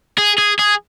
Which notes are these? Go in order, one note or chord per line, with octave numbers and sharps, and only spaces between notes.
G#4
G#4
G#4